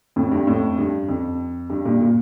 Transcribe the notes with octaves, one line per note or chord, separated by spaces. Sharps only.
F2 A2
G2
F2 A2
G2
F2
G2
G2 A#2
A#2